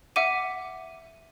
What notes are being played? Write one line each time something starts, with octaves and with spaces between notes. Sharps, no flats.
E5 F#5 D6 D#7